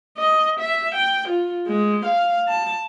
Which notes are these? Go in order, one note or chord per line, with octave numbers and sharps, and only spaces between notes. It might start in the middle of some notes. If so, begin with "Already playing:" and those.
D#5
E5
G5
F4
G#3
F5
A5